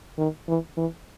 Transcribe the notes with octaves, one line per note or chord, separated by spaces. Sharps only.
D#3
E3
E3